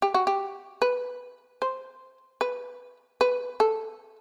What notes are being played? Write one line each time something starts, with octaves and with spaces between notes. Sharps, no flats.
G4
F#4
G4
B4
C5
B4
B4
A4